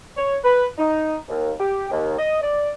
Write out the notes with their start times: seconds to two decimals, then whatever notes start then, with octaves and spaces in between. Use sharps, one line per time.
0.17 C#5
0.44 B4
0.78 D#4
1.29 D#2
1.59 G4
1.91 D#2
2.17 D#5
2.41 D5